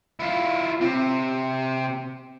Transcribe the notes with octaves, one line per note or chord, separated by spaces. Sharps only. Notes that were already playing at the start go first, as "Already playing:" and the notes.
E4 F4
C3 C4